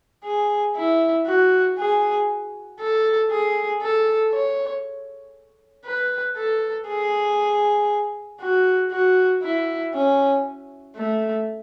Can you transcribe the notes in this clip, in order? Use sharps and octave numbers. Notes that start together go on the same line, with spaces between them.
G#4
E4
F#4
G#4
A4
G#4
A4
C#5
B4
A4
G#4
F#4
F#4
E4
C#4
A3